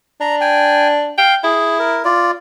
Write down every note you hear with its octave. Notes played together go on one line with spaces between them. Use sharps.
D4 A#5
G5 G#5
F5 G5
E4 G#4
A#4
F4 D5